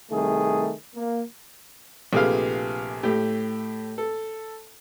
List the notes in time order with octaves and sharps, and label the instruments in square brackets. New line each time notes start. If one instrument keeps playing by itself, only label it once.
[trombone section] C2 D#3 A3 G#4
A#3
[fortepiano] A#1 C3 A3 G#4 B4 F5
A2 A3 G4
A4